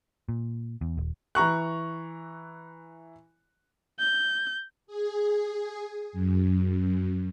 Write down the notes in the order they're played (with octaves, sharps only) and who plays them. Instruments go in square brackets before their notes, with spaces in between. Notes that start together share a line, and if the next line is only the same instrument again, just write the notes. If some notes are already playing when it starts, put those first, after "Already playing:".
[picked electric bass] A#2
E2
D#1
[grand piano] E3 A#5 C#6 F#6
[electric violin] G6
[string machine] G#4
F#2